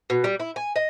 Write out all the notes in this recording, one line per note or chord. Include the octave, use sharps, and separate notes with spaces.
B2
G3
E4
G#5
D#5